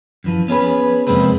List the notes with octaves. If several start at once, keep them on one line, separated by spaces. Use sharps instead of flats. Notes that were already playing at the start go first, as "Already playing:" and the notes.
F#2 E3 F3
B3 C#4 G#4 B4
F2 C3 G#3 A#3 C4 B4